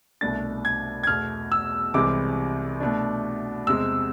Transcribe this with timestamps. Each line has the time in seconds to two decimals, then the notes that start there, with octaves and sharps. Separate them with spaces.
0.21 C2 B2 A3 D4 A6
0.65 G#6
1.03 G#6
1.07 E2 B2 A3 F6
1.52 E6
1.94 C2 C3 E3 G#3 D6
2.80 B2 A3 D4
3.67 E2 C3 G#3 E6